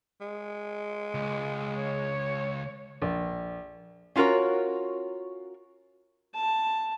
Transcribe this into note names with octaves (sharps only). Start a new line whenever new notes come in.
G#3
C#2
C#5
A#1
C#4 F4 F#4 A#4 C#5
A5